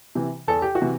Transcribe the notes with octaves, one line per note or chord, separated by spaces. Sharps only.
C3 E3
E2 A4
G4
F#4
C3 E3